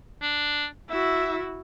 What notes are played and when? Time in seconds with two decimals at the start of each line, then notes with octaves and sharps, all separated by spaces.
0.21 D4
0.90 E4 F#4 E5